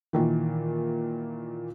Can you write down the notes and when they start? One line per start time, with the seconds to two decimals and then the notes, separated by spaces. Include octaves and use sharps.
0.13 A#2 D#3 E3